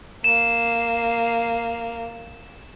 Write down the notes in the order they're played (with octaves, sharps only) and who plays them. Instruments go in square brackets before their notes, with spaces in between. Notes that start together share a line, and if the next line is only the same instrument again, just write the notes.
[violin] A#3 [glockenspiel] E7